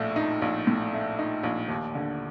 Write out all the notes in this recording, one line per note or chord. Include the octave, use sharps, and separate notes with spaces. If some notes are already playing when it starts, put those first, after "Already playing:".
Already playing: A#1 A2 A3
D#4
A#1
A2
A3
D#4
A#1
D#2
D3